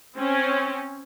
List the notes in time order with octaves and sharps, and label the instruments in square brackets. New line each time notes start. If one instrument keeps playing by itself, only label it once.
[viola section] C4 C#4